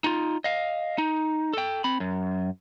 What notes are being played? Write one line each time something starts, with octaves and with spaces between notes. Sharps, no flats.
D#4 F4
D#5 F5
D#4
A4 G5
C4 B5
F#2